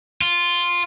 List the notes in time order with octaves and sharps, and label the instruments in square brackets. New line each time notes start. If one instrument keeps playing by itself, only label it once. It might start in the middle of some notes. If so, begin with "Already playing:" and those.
[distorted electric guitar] F4